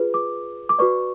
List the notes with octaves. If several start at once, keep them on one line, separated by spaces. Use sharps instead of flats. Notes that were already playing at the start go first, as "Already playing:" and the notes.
Already playing: F4 G#4 B4
D6
D6
F#4 B4 D5 C#6